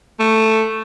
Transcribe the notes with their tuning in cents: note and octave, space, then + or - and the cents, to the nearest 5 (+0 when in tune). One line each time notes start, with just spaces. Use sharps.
A3 +5